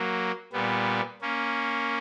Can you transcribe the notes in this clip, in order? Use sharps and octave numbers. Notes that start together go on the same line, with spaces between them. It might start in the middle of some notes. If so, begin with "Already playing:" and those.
Already playing: F#3 A#3
A#2 G3 B3
A#3 C#4